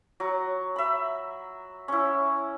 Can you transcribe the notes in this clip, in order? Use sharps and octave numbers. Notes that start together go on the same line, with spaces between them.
F#3
E5 B5
C#4 E4